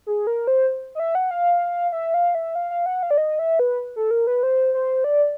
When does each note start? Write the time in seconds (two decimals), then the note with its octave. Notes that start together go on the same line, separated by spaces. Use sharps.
0.06 G#4
0.27 A#4
0.47 C5
0.95 D#5
1.00 E5
1.15 F#5
1.31 F5
1.92 E5
2.14 F5
2.35 E5
2.55 F5
2.71 F5
2.86 F#5
3.03 F5
3.11 D5
3.18 D#5
3.39 E5
3.59 B4
3.96 A4
4.11 A#4
4.27 B4
4.43 C5
4.74 C5
5.04 D5